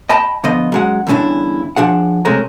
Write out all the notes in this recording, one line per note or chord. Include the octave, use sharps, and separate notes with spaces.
D#5 G5 A5 B5
D3 F3 B3 D#5
F#2 G#3 F#5
E2 G2 D3 C#4 D4 E4
F3 D4 G#4 F#5
C3 G#3 A3 C#4 A#4